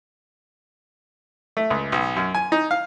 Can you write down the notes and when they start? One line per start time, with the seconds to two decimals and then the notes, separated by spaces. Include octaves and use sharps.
1.57 A3
1.70 C#2
1.92 B1
2.16 F#2
2.35 G#5
2.52 D#4
2.71 F5